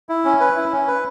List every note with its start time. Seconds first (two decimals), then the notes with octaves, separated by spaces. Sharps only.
0.09 E4
0.25 C#4
0.40 B4
0.56 E4
0.72 C#4
0.87 B4